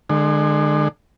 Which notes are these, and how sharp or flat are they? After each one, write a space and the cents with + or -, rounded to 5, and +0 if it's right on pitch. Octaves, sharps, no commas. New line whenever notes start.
D3 +35 G#3 +0